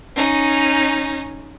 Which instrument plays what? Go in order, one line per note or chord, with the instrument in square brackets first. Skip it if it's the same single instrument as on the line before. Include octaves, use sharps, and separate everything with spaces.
[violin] C#4 D#4